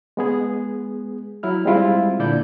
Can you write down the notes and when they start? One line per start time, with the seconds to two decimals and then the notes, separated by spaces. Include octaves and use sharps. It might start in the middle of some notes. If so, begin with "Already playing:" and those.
0.17 G#3 B3 G#4
1.43 F#3 E4 F6
1.65 G3 G#3 C4 E4 F4
2.20 A#2 D3 E4 A4 D5 G6